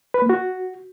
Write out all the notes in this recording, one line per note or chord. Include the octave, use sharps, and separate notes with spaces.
B4
A#3
F#4